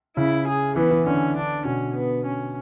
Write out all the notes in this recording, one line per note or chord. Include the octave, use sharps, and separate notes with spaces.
C#3 E4
G#4
E3 B3
E3
D3 C#4
D4
B2 C#4
B3
C#4